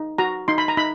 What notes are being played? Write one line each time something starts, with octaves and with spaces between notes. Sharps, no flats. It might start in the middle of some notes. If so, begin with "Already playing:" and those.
Already playing: D#4
F#4 A#5
D#4 C6
B5
A#5
D#4 B5